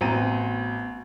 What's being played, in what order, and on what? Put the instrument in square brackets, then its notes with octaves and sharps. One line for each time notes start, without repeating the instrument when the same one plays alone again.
[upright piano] A1 B2 C4 A#5 D#7